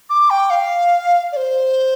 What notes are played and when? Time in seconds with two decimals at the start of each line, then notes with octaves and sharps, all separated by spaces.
0.09 D6
0.30 G5
0.50 F5
1.32 D5
1.36 C5